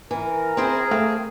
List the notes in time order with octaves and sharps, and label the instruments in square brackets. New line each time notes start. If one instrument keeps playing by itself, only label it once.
[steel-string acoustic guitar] E3 [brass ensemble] A#4
[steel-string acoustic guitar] C4 E4 C5 [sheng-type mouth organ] G#4
[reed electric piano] A3 F5 [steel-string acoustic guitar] C4